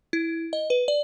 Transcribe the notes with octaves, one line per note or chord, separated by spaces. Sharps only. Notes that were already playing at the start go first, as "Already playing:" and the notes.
E4
D#5
B4
D5